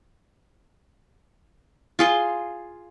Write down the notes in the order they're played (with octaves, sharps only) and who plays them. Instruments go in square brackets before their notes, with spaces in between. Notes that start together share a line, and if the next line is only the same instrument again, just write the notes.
[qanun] F4 G#4 C6